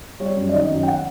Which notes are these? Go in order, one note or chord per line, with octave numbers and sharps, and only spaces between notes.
G3 C#5
F#2
D5
D#3 D#5
F#2
G5
F#5